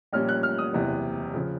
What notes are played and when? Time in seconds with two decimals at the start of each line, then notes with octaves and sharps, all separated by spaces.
0.13 A#1 A#2 G3 A#3 C#4 F6
0.29 F#6
0.43 F6
0.58 D#6
0.73 F#1 E2 C3 E3
1.34 C#3 F3